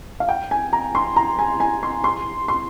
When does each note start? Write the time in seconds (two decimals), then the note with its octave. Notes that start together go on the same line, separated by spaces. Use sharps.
0.20 F5
0.29 G5
0.51 G#5
0.73 A#5
0.95 C6
1.16 A#5
1.39 G#5
1.60 G#5
1.83 C6
2.04 C6
2.48 C6